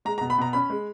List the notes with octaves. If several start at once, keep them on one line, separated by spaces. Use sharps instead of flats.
G#3 A#5
A#5
B2
B5
B2 A#5
C#4 B5
G#3